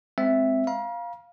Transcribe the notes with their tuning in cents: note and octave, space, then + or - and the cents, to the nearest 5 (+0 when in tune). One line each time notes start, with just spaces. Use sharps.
G#3 +0 C4 -10 E5 +0
F5 +0 A#5 +45